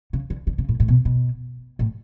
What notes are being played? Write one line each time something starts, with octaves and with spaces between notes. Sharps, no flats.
C#3
D3
D3
C#3
A2
A2
B2
B2
A2